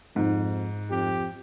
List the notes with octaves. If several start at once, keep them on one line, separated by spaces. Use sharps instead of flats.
F2 G#2
F2 G4